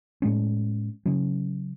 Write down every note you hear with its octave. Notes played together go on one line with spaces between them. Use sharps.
A2 G#3 C#4
C#3 F#3 C#4